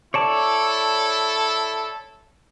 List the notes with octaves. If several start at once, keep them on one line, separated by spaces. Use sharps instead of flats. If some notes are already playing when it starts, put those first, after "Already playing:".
E4 A4 C#5 D5 A5